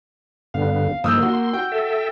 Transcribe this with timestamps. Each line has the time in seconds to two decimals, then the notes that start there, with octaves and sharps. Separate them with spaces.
0.54 G2 D3 B3 F5
1.04 G2 D#3 F3 A#3 D#6 E6 G6
1.22 F#4 C6
1.53 F#4 G5
1.72 A4 E5